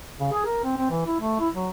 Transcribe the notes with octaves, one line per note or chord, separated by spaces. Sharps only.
C#3
G#4
A#4
C4
C4
E3
E4
A3
E4
F#3